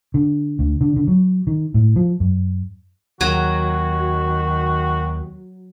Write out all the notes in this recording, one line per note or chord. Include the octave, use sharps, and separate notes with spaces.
D3
D2
D3
D3
F#3
D#3
A2
F3
F#2
D#2 D#3 F#3 F#4